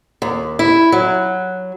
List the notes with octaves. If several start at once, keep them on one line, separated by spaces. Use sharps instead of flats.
D#2
E4
F#3